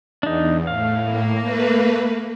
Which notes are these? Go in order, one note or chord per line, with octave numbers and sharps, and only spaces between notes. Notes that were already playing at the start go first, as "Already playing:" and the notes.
E2 D4 D#4
A2 F5
A#3
A3 B4